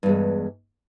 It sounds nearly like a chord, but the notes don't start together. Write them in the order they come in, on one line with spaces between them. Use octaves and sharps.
G2 E2 G#3